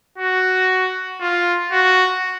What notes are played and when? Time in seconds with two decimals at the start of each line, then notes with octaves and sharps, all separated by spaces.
0.18 F#4
1.21 F4
1.72 F#4